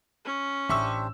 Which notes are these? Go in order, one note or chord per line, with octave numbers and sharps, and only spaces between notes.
C#4
A1 D4 G4 C5 E5 C#6 E6